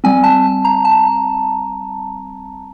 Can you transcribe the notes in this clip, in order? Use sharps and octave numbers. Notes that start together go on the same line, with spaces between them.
G3 C4 G#5
A5
A#5
A5